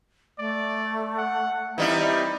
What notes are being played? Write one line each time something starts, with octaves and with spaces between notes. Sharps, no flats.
A3 D5
F#5
E3 G3 C4 D#4 E4